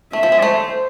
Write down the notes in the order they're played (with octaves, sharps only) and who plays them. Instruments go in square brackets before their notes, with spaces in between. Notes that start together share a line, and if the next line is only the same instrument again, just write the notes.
[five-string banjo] A3 [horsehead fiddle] E5
[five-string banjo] F3
G#3
[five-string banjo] A3 [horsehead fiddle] C5